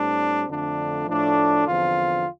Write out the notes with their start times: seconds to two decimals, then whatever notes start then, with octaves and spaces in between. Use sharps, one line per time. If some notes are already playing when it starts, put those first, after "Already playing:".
Already playing: A2 G3 C4 D4
0.50 F2 D3 F3 A3 D4
1.08 A2 F3 A3 D4
1.66 E2 D3 F3 C4 F4